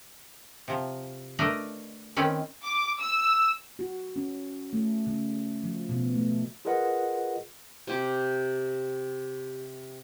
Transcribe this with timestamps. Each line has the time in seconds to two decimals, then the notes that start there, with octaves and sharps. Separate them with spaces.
0.68 C3 F3
1.39 A3 D4 A#4 B4 D5 D#5
2.16 D#3 C4 C#4 B4
2.63 D6
3.00 E6
3.79 F#4
4.16 C#4
4.73 A3
5.07 C#3
5.64 F3
5.89 B2
6.15 A3
6.65 F4 G#4 A#4 B4 D#5 F#5
7.87 C3 G4 D6